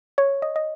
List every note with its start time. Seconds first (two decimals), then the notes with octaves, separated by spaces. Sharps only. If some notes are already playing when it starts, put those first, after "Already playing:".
0.18 C#5
0.42 D#5
0.56 D#5